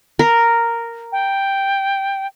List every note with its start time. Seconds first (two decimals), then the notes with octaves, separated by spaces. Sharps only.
0.19 A#4
1.12 G5